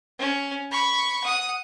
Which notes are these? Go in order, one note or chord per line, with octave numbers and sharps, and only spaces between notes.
C#4
B5 C#6
F#5 D#6